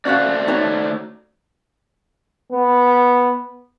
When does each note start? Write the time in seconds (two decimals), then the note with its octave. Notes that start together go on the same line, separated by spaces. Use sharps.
0.05 A3 C#4 F#4 C5 D5 F5
0.48 D#4 F#4 C#5
2.52 B3